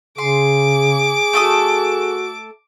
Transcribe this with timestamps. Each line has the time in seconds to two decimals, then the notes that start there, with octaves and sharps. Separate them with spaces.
0.18 C#3 G#4 C6 D6
1.33 A3 F#4 A4 D#6